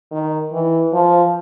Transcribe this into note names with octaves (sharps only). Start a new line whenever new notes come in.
D#3
E3
F3